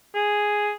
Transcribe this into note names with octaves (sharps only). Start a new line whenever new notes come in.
G#4